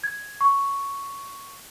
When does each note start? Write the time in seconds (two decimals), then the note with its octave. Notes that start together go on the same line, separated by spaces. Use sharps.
0.04 G#6
0.41 C#6